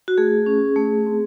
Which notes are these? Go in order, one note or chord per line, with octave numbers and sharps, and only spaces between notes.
F#4
A3 G#4
C#4
A3
C4